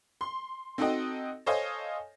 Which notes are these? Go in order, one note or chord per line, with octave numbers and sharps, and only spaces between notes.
C6
C4 D#4 F#4 A4 D#5 G5
A4 C5 C#5 D#5 F5 G#5